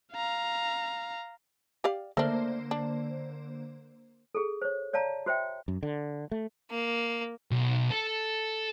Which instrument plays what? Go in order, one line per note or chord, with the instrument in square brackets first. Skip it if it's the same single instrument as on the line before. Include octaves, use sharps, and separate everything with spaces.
[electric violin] F5 A#5
[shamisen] G4 D5 F5
[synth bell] D3 A#3 C5 [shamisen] A3 D4
[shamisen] D4
[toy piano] G#4 A4
C5 C#5
C#5 D5 F5 A5 A#5
F#4 C5 E5 G5
[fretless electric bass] F#2
D3
A3
[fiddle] A#3
[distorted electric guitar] B1
A4